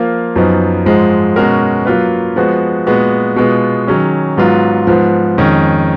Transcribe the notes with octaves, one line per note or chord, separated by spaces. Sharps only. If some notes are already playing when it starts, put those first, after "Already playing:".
Already playing: F3 A#3 F4 A#4
F#2 F3 B3 D#4
G#2 F3 G#3
B2 G#3 C#4 F#4 A#4
F#3 A#3 F4 B4
F3 G#3 B3 F#4
A#2 G#3 B3 F#4
B2 G#3 B3 F4
D#3 F#3 C#4 G#4
G#2 F#3 B3 F4
G#2 F3 B3
F2 D#3 G#3 C#4